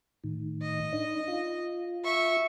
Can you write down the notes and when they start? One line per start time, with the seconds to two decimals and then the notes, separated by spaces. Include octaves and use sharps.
0.24 A2 D#3
0.62 D#5
0.93 D4 D#4
1.28 F4
2.04 E5 C#6